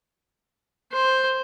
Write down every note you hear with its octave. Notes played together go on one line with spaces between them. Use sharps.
C5